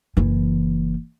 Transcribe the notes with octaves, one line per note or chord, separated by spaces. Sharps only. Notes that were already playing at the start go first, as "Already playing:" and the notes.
F#1 E3